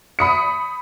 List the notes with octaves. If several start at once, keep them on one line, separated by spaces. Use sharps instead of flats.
B5 D#6 C#7